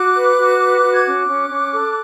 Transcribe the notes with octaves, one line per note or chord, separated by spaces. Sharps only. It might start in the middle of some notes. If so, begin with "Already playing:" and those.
Already playing: F#4 D6 F#6
B4
F#4
B4
F#4
G#6
C#4 D6 F#6
C#4
C#4
A4